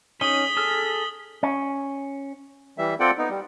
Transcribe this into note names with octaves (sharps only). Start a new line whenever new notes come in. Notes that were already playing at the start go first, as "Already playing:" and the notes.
C#4 D#4 D#6 B6 F#7 G7
G#4 A4 F6
C#4
E3 G3 E5
C4 F4 A4 D5 F#5 G5
B3 D#4
G3